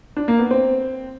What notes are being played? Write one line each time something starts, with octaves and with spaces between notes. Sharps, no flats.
D4
A#3
B3
C4